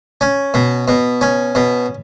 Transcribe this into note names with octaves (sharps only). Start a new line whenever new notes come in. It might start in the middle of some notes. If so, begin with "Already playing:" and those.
C#4
B2
B2
C#4
B2